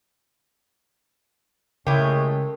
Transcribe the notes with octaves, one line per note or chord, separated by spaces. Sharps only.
C#3 G#3 A3 C#4 E4 G4 A#4